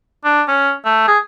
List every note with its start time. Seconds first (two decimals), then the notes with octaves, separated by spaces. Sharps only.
0.25 D4
0.48 C#4
0.85 A3
1.08 G#4